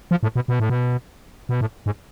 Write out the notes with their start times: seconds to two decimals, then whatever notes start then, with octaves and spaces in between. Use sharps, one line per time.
0.11 F3
0.23 A2
0.35 B2
0.48 B2
0.60 A2
0.70 B2
1.49 B2
1.61 A2
1.86 G#2